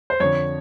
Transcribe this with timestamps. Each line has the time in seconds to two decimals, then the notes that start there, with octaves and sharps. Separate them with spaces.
0.10 C5
0.20 F2 D3 C#5